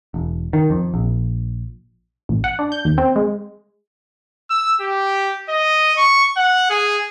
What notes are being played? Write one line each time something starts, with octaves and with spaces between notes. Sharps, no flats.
E1
D#3
F2
A#1
A1
F#5
D4
G6
D#2
C4
G#3
E6
G4
D#5
C#6
F#5
G#4